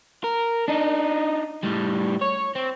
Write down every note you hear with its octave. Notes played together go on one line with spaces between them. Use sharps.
A#4
D4 D#4
A2 G3
C#5
C4